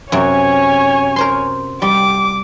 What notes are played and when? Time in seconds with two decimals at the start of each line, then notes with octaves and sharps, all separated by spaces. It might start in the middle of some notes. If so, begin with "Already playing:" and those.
0.12 F#2 C3 C#5 G#5
1.16 A#4 C5 C6
1.82 G3 D6